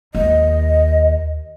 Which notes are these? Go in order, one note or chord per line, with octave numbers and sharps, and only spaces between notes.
D#2 D#5